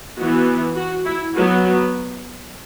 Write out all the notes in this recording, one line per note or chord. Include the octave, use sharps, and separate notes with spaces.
E3 B3 F#4
F#4
E4
F#3 B3 F#4